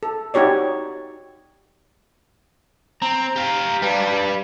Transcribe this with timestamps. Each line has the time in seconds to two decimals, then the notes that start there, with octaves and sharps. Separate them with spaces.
0.03 A4
0.34 D#4 F#4 G4 C#5 D5
3.02 C4 A#5
3.36 G4 F5
3.82 G3 D4 B4 F5